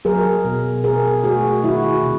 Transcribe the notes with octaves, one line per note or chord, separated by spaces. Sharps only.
F#3 G#4 A#4
B2
B2 G#4 A#4
A3 F#4 G#4
D#3 E4 F#4
C3